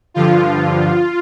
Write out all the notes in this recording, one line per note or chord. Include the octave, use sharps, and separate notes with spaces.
G2 D3 F3 F4